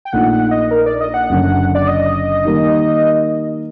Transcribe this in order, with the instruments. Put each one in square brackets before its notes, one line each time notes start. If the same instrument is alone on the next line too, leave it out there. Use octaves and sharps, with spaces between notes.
[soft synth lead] G5
[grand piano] A#1 A#2 A3 D#4 [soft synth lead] F#5
[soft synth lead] F#5
D#5
A#4
D5
D#5
F#5
[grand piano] F#1 F#2 D3
[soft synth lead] D5
D#5
[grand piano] D#3 G3 A#3